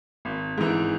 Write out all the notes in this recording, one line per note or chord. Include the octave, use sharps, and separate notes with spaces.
G#1
G#2 E3